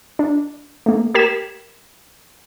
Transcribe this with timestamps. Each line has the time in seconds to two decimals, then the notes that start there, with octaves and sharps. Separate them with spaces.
0.19 D4
0.86 A3 A#3
1.14 G4 A#4 G#6 B6 E7